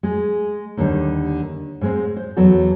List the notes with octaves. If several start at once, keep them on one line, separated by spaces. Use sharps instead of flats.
G#3 G#4
D#2 D3 D#3 G3
G#2 G#3 C4
C5
E2 F#3 B3 A4 A5